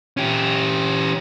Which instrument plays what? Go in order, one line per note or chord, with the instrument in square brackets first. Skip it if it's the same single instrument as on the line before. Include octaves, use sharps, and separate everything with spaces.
[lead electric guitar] C#4 G4